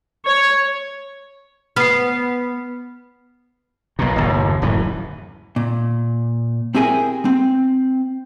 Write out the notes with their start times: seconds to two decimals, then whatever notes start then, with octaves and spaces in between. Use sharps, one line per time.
0.25 C#5
1.76 B3 B4 F6 C7
3.99 B1 A#2
4.16 F#1 D#2 A2
4.62 D1 F#2 E3
5.56 A#2
6.75 C4 E4 G4 G#4 A#4 G#5
7.25 C4